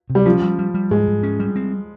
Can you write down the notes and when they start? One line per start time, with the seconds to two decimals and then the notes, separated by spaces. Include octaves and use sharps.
0.10 C3
0.15 G3
0.25 F3 C#4
0.42 G3
0.59 G3
0.74 G3
0.91 G#2 G#3
1.07 G#2
1.23 C#4
1.40 G3
1.56 C4